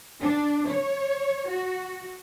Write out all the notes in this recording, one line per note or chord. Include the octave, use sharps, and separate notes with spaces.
D4
C#5
F#4